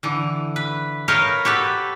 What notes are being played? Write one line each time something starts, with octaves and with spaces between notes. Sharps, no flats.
D3 E3
B4
A#4 B4 C#5 D#5 F5 G5
F#4 G4 A4 B4